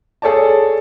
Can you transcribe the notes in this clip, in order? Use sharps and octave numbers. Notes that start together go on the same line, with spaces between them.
G#4 A4 C#5 D5 A5